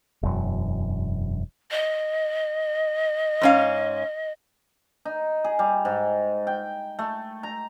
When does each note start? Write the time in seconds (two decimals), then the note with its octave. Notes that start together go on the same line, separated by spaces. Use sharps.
0.23 E1 F#2
1.71 D#5
3.41 G#2 C#4 F5
5.05 D#4
5.44 G#4
5.59 G3
5.85 G#2
6.47 G5
6.99 A3
7.43 A#5